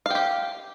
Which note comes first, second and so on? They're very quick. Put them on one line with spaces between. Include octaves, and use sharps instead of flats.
F5 G5 G4